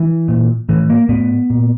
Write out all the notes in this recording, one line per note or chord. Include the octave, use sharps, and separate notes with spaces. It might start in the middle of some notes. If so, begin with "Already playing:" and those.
Already playing: E3
A#2
A2 E3
A#3
A2 B3
A#2